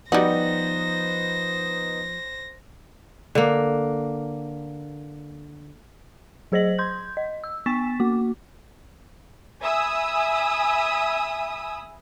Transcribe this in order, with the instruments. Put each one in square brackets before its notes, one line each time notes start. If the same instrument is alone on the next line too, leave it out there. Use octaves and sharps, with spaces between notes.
[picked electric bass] F3 [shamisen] G3 F#4 [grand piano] B3 D#4 [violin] C5 A#6
[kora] D3 A#3
[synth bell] F#3 G#4 C5 D#5 A#6 F#7
C6 G6 G#6
D#5
E6
B3 G#5 C#6 A6 B6 E7
A#3 F#4 D6
[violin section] E5 G#5 B5 D#6 E6